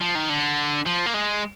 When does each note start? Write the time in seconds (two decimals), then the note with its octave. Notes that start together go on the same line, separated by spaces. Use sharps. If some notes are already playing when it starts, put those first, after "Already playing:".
0.01 F3
0.15 D#3
0.29 D3
0.86 F3
1.06 A#3
1.14 G#3